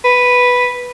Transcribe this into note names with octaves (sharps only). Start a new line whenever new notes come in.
B4